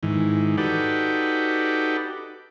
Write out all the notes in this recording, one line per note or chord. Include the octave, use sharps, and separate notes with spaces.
G#2 D#3 E3
D#4 F#4 G4 A4 B4 D5